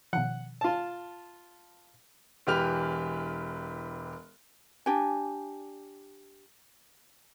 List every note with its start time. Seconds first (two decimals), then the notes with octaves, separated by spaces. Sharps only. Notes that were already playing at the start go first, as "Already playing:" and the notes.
0.13 B2 D#3 F3 F#5
0.61 F4 A5
2.47 E1 E3 G4 B4 F6 F7
4.86 D4 G4 G#5